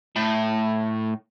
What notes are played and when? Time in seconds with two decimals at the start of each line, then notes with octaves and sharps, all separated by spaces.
0.16 A2